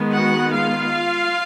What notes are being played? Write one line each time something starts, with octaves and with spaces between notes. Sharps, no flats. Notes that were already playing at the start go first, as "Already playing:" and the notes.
Already playing: D#3 G#3 B3
F#4 F#5
F4 F5